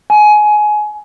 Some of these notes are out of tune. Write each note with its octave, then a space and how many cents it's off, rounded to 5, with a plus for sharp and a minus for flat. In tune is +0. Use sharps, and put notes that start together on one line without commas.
G#5 +20